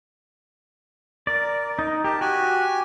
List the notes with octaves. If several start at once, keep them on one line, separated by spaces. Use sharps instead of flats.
A#4 D5
D#4
G4 A#4 A5
F#4 G4 G#5